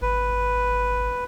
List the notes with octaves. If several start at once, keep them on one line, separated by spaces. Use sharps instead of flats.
G#1 B4